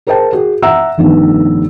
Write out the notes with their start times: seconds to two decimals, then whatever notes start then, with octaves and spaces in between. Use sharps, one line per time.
0.07 G#4 A#4 C5 D#5 G5 A5
0.33 F#4 G#4
0.62 E5 F#5 A#5 E6
0.98 F1 G2 D#3 B3